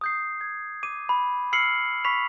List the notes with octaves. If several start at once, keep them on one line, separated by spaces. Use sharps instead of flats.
D#6 G6 C7
G#6
D6 D#7
B5
E6 F6 C7 C#7 F#7
B5 C#6 B6 F7